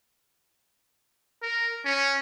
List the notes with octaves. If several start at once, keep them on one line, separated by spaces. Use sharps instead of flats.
A#4
C#4